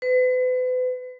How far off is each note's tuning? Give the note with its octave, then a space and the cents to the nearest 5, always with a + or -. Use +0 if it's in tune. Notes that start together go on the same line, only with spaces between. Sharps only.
B4 +40